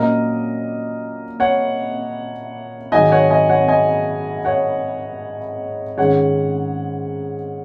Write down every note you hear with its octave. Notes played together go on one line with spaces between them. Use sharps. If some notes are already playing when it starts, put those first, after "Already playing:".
Already playing: A#2 F#3 A#3 C#4 A#4 D#5
C#5 F#5
G#2 D#3 F#3 D#5 G#5
C#5 F#5
D#5 G#5
C#5 F#5
D#5 G#5
C#5 F#5
G#2 D#3 G#3 C#4 C#5 F#5